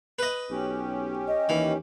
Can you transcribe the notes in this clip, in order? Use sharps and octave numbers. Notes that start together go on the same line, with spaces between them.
B4 D#5
B1 C#4 G4
D#5
D#2 E3